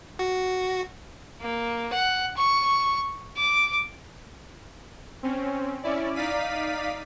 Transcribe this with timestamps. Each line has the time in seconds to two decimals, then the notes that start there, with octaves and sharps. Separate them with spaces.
0.19 F#4
1.41 A#3
1.93 F#5
2.37 C#6
3.37 D6
5.23 C4 C#4
5.83 C#4 E4 D5
6.15 D#4 D5 F5 B6 D#7